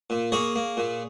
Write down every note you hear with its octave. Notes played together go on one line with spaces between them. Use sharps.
A#2
A#3 G#4 C#5
A#3
A#2